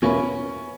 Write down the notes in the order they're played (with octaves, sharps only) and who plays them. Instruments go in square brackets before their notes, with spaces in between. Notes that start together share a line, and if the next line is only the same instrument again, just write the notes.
[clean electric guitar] E2 B2 A#3 E4 B4 [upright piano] C#4